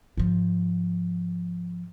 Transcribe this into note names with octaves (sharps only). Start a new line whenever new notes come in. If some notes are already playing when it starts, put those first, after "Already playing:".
G#2 F3